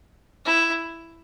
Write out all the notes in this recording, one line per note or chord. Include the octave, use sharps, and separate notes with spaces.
E4